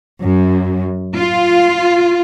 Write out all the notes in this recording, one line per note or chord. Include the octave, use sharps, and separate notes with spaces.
F#2
F4